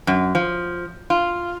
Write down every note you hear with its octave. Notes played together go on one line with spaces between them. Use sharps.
F#2
F3
F4